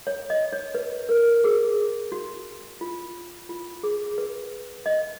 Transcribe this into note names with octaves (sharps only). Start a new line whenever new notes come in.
C#5
D#5
C#5
B4
A#4
G#4
F#4
F4
F4
G#4
B4
D#5